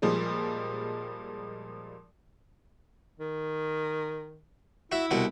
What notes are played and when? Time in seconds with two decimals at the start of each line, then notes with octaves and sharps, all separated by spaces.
0.02 A#2 F3 G3 G#3
3.20 D#3
4.92 E4 F#4 E5
5.11 C2 B2 F#4